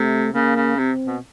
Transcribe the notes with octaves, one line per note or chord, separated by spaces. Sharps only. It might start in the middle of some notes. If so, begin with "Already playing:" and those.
Already playing: C3 A3
C#3 A#3
C#3
C3 C4
B2